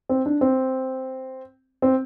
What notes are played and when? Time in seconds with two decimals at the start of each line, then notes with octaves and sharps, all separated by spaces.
0.09 C4
0.26 D4
0.41 C4
1.82 C4